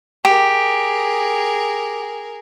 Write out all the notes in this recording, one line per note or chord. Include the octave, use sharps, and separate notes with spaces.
G4 G#4 A#4